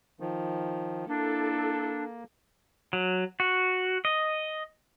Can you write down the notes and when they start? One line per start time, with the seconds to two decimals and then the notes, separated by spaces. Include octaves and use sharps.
0.20 D#3 F3
1.08 A#3 D4 E4 A4
2.93 F#3
3.40 F#4
4.05 D#5